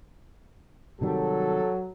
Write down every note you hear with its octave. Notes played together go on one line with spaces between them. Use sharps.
C3 D#3 F#3 G3 A4